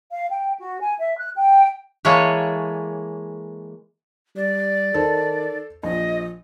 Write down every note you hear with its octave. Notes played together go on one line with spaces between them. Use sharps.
F5
G5
F#4
G#5
E5
F#6
G5
E3 G#3 A#3 G#4 A4 C#5
G3 D5
D#3 A4 C5
A#1 F3 D#5